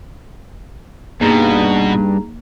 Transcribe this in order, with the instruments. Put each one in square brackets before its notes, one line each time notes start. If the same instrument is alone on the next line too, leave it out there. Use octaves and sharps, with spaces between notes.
[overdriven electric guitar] G2 [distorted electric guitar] B2 [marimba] A#3 [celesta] D#4 G#4 A#5